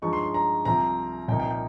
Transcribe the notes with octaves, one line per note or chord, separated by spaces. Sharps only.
G2 F3 G#3 D#4 C#6
C6
C6
A#5
C2 C3 F3 C4 A#5
C2 A#2 F3 A#3 D#4 G5
G5
G5